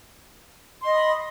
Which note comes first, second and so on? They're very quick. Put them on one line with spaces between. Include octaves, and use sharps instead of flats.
C6 D#5 D#6 B5